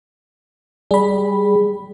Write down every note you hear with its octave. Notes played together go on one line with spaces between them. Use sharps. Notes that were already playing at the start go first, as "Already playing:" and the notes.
G3 G#4 B5